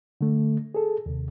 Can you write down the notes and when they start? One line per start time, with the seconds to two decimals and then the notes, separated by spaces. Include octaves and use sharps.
0.21 D3 A3
0.75 G#4 A4
1.06 D#2 C3